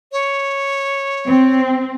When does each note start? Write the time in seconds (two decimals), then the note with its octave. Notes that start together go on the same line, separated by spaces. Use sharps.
0.12 C#5
1.27 C4